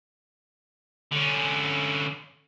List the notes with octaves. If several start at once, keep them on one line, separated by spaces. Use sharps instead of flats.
D3 C#4